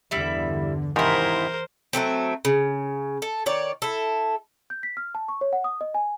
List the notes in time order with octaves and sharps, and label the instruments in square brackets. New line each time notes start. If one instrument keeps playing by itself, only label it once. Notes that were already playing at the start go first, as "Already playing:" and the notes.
[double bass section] E2 G2 D3 [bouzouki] G3 E4 E5
[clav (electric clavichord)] G#2 D#3 [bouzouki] C3 E4 [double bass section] E3 [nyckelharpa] A#4 C5
[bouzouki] F#3 G#3 A3 C4
C#3
A4
D#3 C#5 D5
E4 A4
[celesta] G6
B6
F6
A5
C#6
C#5
F#5
D#6
D#5
G#5